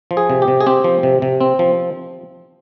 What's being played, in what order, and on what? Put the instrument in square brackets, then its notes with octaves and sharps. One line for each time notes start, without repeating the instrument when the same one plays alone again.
[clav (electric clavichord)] F3
G#4
C3
G4
C3
G#4
C4 G4
F3
C3
C3
C4
F3